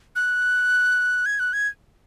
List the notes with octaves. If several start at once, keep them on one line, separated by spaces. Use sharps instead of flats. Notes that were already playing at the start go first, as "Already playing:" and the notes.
F#6
G#6
F#6
G#6